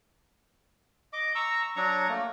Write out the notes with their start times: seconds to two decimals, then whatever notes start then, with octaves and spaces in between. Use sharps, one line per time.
1.13 D#5 D6
1.35 A#5 C#6 E6
1.76 F#3 D4 A#5 C#6
2.09 A3 A#3